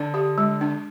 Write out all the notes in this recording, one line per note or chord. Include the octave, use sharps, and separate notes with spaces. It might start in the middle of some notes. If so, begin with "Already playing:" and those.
Already playing: D3 D4
G4
G#3
D4